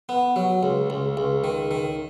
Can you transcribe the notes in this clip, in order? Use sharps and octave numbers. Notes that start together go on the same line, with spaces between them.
B3
F#3
C#2
C#2
C#2
D#3
D#3